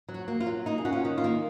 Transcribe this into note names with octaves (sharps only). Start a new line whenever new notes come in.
F#3
F#4
A#3
F4
F#3
A#3 D#4
G#4
C#4 F#4
F4
D#3
F4
A#3